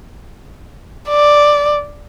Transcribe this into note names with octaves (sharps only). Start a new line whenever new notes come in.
D5